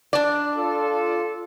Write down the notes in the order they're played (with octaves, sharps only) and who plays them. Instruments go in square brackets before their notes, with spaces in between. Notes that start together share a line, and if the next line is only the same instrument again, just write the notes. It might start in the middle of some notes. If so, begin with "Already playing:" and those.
[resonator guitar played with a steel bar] D4 D5
[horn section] F4 A4